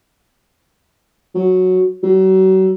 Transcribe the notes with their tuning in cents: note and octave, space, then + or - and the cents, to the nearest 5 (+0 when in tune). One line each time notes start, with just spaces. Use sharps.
F#3 -5
F#3 +35